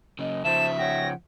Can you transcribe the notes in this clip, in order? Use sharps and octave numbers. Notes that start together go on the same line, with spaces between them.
F#2 C#3 D#5
C#3 F3 C5 E5 A5 E7
C#5 F#5 G5 A#6